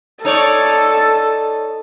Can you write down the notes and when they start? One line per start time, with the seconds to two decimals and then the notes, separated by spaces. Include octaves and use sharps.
0.25 D#4 A4 C#5 D5